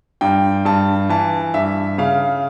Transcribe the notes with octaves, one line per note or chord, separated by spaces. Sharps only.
G2 G5
G2 A5
E3 A5
G2 E5
C#3 F5